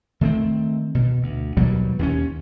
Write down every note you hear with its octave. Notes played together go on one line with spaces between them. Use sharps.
D#3 A3 A#3 C4
B2
D2
D#2 B2 F#3 G3
D#2 C4 C#4